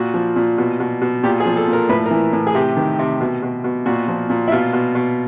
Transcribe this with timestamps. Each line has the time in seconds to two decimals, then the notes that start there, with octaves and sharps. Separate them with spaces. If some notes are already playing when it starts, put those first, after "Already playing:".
Already playing: A#2 F#4
0.14 F3
0.36 A#2
0.58 B2
0.80 B2
1.02 B2
1.23 A#2 G4
1.40 G#4
1.46 F3
1.57 A4
1.67 A#2
1.73 A#4
1.89 A2 B4
2.06 A#4
2.11 E3
2.33 A2
2.47 G#4
2.55 C3 G4
2.77 D#3
2.99 C3
3.21 B2
3.43 B2
3.64 B2
3.86 A#2 F#4
4.08 F3
4.30 A#2
4.48 E4
4.52 B2 F4
4.73 B2
4.95 B2